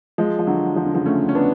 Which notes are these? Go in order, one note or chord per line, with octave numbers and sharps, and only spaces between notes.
F3 G#3
F3
D3 F#3
F3
D3
C#3 F3
A3 C#4
C#4
B3 D4